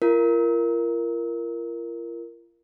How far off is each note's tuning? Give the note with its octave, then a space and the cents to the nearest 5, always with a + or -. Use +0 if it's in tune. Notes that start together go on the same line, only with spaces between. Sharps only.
F4 -40 A#4 +0